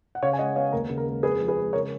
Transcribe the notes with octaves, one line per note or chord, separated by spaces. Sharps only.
F#5
C#3 C#5 F5
G#5
G#3 D#5 F#5
B3 C#5 F5
D#2 A#4
C#3
A#4
G#3
F2 G#4 B4
F3
G#4 B4
G#3
C#3 A#4 C#5